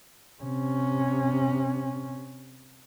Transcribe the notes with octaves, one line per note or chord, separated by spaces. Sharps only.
C3 C#4